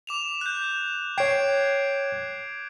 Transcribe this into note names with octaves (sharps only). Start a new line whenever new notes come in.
D6 E7 F7
F#6 G6
C#5 G5 G#6 C7 D7